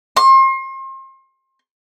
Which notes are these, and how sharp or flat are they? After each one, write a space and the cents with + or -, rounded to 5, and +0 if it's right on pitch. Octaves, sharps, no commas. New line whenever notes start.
C6 +35